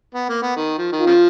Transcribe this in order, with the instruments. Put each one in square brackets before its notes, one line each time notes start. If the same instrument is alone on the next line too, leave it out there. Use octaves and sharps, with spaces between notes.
[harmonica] B3
A#3
B3
D#3
F3
D#3
[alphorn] F4
[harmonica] C#3 F3